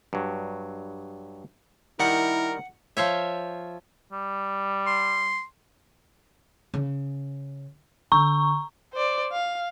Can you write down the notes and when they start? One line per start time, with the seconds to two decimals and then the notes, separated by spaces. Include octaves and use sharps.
0.13 G2 F#3
2.00 D#3 G3 E4 A#4 F#5
2.97 F3 F4 C#5 E5
4.12 G3
4.87 C6
6.74 C#3
8.12 D3 A#5 C#6
8.93 C5 D5
9.32 F5